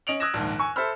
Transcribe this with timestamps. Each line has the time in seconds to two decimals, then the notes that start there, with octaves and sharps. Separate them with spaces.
0.07 C#4 D#5 D7 F7 F#7
0.20 D#6 E6 F#6 G#6 A#6 E7
0.34 A#1 D#2 G#2
0.59 G#5 C#6 E6
0.76 A4 C5 E5 B5 E6 F6